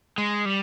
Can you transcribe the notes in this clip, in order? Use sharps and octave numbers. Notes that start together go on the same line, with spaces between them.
G#3
G3